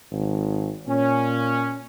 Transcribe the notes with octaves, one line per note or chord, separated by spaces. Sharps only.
G#1
A#2 C#4